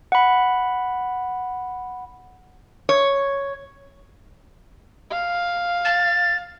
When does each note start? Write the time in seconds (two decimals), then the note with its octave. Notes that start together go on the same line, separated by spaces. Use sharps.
0.12 F#5 B5
2.89 C#5
5.12 F5
5.85 A6